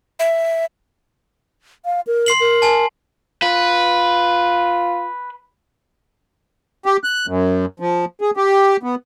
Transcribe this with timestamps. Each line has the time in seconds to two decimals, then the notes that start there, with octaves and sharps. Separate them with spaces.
0.19 E5
1.85 F5
2.07 A#4
2.26 C6 C7 F#7
2.40 A#4
2.62 G#5 A5
3.42 F4 B4
6.86 G4
7.04 F#6
7.27 F#2
7.80 F3
8.21 G#4
8.37 G4
8.83 B3